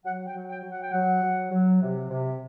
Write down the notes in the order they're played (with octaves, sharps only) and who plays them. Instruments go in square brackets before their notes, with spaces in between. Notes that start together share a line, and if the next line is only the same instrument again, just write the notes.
[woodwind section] F#3 F#5
G5
F#3
G5
F#3
F#5
G5
F#3 F#5
F#3
F#3
C3
C3